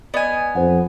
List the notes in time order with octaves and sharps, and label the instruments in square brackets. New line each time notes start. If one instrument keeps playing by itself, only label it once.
[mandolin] B3 G#5 [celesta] D5 D#5
[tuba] F2 [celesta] C5 F#5